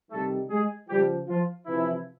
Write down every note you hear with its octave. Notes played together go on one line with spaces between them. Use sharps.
C3 D#3 G3 A3 A4
G#3 G#4
C#3 F3 G3 G4
F3 F4
C3 E3 F3 E4